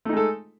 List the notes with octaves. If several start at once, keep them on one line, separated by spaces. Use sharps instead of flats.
G#3 A3 D#4 A4